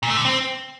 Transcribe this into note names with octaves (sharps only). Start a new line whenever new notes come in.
A#2
A3
D3
C4